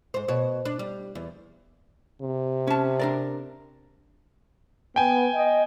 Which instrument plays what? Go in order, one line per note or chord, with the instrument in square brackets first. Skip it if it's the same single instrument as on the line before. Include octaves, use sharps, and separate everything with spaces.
[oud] G#2 C5
B2 F#4 C#5
D4
G3
E2
[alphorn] C3
[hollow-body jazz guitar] C#4 A5
D4 A#4 D5
[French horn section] B3 [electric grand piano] G5 G#5
[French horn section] D#5